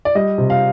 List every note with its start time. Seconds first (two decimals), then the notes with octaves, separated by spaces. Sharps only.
0.05 D5
0.15 G3 D#5
0.38 C3
0.50 F5